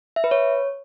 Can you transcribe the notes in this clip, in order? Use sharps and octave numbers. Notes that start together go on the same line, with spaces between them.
E5
B4
C#5